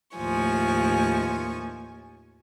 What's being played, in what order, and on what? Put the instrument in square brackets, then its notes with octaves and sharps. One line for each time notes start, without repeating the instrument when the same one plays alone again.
[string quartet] D#2 A2 F3 G#5 C#6